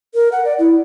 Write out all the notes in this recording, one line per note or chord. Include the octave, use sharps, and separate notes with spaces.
A#4
F#5
D5
E4